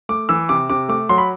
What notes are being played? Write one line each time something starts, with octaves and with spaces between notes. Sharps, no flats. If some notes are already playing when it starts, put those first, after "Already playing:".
A3 D6
E3 E6
C3 D6
C3 D6
A3 D6
F#3 C6
B5